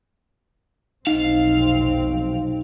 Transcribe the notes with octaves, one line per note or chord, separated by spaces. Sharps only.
F1 B1 C4 D#4 F5